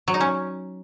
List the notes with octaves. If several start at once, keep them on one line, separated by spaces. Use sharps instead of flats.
F#3
D#4
C#4